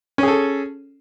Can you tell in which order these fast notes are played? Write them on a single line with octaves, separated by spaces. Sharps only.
C#4 G#4 A4